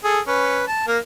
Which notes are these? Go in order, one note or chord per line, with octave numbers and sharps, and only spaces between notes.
G#4 A4
C#4 B4
A5
A#3 A#4